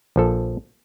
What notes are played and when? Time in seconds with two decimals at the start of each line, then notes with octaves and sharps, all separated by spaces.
0.16 A#1 F3 A4